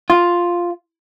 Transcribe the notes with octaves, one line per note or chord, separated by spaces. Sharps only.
F4